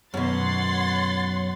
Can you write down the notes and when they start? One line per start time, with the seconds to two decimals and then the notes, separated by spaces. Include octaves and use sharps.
0.14 F#2 B2 C#5 F#5 C6 A6